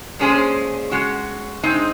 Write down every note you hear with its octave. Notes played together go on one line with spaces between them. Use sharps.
A#2 G#3 C#4 G#4 C5
G#3 C#4 F#4
G#3 C4 D#4